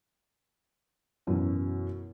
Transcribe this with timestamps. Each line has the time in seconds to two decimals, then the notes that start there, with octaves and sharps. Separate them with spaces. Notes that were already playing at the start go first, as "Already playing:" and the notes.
1.27 F#2 B2 E3